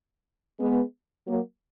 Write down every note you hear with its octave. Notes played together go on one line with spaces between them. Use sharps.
G#3 B3
F#3 A#3